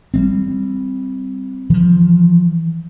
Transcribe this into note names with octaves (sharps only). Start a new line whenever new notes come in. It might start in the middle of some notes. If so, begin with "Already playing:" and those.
G3 G#3 C4
E3 F3